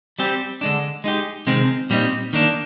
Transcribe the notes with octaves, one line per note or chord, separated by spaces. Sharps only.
G3 C4 G4
D3 G#3 D4
G#3 D#4 G4
C3 D#3 G#3 C4
A#2 G3 C4 D#4
D#3 A#3 D4